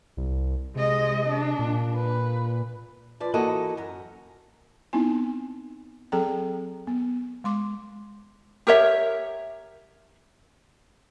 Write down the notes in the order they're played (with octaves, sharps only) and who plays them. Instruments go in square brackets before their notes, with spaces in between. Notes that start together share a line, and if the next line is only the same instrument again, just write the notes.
[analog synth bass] C2
[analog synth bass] C3 [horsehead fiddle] G#3 D#5
[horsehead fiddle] D4
[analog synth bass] A#2
[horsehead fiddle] B4
[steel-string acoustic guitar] F3 B4 D5
E3 A#3 F#4 A4 D#5
F#2 A#5
[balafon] B3 C4 D#4 E4 G#5
F#3 C4 G#4 A4 G5 A#5
B3
G#3 C6 D6
[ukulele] G4 A#4 C#5 E5